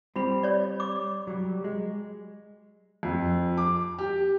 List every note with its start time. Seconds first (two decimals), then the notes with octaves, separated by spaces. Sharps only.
0.16 G3 C4 F4 B5
0.43 C#5 D5
0.80 D6
1.27 F#3 G3
1.64 G#3
3.03 F2
3.58 D6
3.99 G4